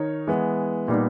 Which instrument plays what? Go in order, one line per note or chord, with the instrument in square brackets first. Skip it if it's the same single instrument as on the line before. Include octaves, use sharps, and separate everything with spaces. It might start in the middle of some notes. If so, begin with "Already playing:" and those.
Already playing: [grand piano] D#3 D#4 A#4 C#5
E3 G#3 B3
A#2 G3 B3 D#4